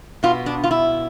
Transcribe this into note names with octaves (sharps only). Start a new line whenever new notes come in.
B2 B3 F4
D4
F4
E4